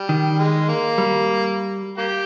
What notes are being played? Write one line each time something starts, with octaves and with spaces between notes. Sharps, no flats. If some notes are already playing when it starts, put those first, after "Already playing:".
Already playing: G3
D#3
G#3
A#3
G3
A#3 G4